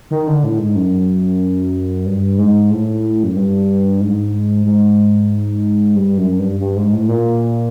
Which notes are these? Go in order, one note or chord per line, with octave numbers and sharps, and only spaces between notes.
D#3
D3
A2
G#2
F#2
G2
G#2
A2
F#2
G2
G#2
G#2
G2
F#2
G2
G2
G#2
A2
A#2